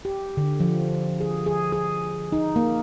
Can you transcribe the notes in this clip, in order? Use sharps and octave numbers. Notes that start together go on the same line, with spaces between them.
G4
D3
F3
G#4
G#4
G#4
D#4
A#3